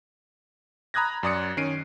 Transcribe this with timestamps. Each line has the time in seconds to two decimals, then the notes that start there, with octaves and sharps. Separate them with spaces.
0.94 A#5 B5 D#6 F#6 G#6 A#6
1.23 F#2 D5 D#6 C#7
1.57 D#3 C#4 C7 D7 D#7